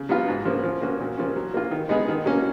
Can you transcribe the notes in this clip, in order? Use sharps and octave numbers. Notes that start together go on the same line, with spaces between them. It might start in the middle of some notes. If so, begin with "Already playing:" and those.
Already playing: C#3
F#3 B3 F4
G#2
F3 A#3 C#4
F3
A#3 C#4 F#4
A#2
F3 A#3 C#4
F#3
A#3 F4
D#3
G#3 B3 D#4 G#4
D#3
F#3 A#3 C#4